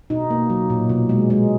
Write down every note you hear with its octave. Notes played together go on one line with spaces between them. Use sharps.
B2 D#4
A#3
F#3
A#2
B2
G#3
G#3